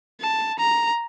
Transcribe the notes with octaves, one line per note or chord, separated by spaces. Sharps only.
A5
A#5